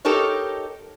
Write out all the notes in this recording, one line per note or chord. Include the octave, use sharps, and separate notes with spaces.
D#4 G4 A4 A#4 C#5